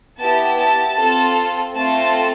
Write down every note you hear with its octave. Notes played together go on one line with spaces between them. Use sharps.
B3 E4 G4 A5
A5
C4 F4 A4
A3 C4 F4 A4 A5